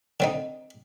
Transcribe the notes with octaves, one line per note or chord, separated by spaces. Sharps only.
D3 C4 D#4